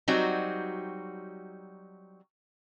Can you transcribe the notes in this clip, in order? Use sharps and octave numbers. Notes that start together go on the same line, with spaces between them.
F#3 G3 C4 D#4 F#4